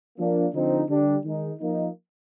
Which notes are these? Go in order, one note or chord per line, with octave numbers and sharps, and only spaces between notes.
F3 A#3 D4
D3 F3 C4 D#4
D3 G3 D4
D#3 G#3 D#4
F3 A#3 D#4